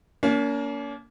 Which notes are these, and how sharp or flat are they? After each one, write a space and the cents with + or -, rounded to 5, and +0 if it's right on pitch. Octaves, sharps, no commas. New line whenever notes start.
A#3 +0 C#4 +45